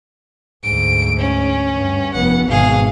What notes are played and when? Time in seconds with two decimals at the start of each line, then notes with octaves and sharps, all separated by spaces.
0.64 D2 G#2 D7
1.20 C#4
1.75 G2
2.14 F1 B3 F#5
2.49 G#1 B2 G#4 F5